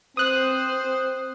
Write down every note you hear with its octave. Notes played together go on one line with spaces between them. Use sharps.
C4 C5 D#6 F#6